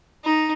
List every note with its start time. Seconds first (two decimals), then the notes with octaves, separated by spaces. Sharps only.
0.24 D#4